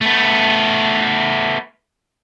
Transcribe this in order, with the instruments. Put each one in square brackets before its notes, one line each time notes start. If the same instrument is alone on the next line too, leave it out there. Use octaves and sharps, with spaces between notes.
[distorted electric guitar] A3 B3